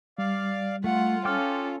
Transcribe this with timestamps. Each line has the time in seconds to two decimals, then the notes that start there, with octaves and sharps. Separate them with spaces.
0.18 G3 D5 F5
0.84 A3 F4 F#5
1.25 C#4 A4 G5 D6 F6